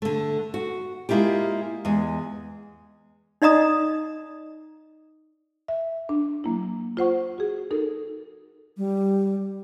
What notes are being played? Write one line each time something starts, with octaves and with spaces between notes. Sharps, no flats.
D3 A3
F#4
G#3 A#3 E4 F4 G4
E2 G#3
D#4 D5 D#5 A#5 D#6
E5
D4
F#3 A#3 E4
F4 C5 F#5 C#6
F#4 G#4
D#4 A4 A#4
G3